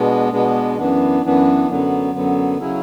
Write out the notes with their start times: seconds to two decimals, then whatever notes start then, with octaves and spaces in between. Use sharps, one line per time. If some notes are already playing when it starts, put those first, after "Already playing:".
Already playing: B2 G#3 B3 D4
0.32 B2 G#3 B3 D4
0.78 F#2 E3 B3 D4
1.22 F#2 E3 B3 D4
1.68 F#2 D3 F#3 B3
2.13 F#2 D3 F#3 B3
2.59 C#3 F#3 C#4 E4